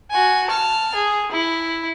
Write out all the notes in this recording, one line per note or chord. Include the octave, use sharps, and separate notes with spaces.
F#4 G#5
A5 F6
G#4
E4